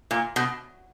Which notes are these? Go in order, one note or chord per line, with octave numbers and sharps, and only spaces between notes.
A#2
B2